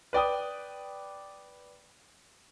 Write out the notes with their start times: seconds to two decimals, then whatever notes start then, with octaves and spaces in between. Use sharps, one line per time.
0.13 B4 D5 G5 D#6